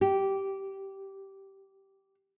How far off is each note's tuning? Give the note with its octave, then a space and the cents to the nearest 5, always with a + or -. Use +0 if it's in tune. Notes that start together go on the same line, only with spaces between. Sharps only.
G4 -10